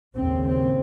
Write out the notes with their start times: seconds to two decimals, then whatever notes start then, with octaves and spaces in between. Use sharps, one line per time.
0.16 D#2 C#3 C4
0.44 C4